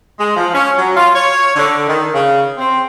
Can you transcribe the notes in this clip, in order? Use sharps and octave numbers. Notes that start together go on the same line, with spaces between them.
G#3
F3
C#4
F#3
F4
C#5
D3
D#3
C#3
C4